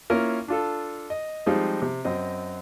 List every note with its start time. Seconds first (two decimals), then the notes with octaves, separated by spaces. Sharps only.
0.10 A#3 C#4 E4 F4 A#4
0.48 D4 F4 A4
1.10 D#5
1.46 F3 G3 G#3 C4 D#4 F4
1.82 C3
2.05 F#2 C4 D#5